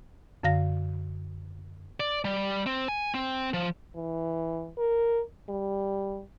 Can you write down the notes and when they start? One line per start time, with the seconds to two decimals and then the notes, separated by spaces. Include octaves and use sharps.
0.43 F#2 D3 F5 A#6
2.00 D5
2.25 G3
2.66 C4
2.88 G#5
3.14 C4
3.54 F3
3.96 E3
4.78 A#4
5.49 G3